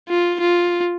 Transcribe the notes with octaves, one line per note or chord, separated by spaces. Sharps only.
F4
F4